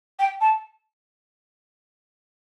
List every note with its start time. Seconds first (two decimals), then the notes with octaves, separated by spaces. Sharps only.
0.19 G5
0.41 A5